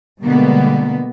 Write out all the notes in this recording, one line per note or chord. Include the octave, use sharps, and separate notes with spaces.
B2 D3 G3 G#3 A#3 B3